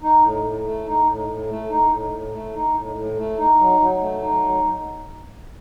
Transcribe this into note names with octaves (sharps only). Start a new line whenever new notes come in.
D#4
A2
A2
A3
D#4
A2
A2
A3
D#4
A2
A2
A3
D#4
A2
A2
A3
D#4
F#3
F#3
A3
D#4
F#3